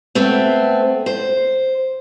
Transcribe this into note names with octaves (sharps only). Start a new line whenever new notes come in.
A3 B3 C4
C5